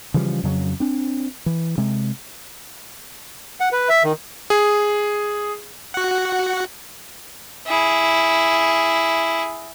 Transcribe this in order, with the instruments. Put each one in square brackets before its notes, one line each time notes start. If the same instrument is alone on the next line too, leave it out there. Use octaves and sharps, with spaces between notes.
[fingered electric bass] C#3 E3 F3 G3
F2 C#3 F#3
C4 D4
E3
C3 G#3
[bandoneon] F#5
B4
E5
D#3
[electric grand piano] G#4
[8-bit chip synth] F#4 F#5
[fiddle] E4 G#4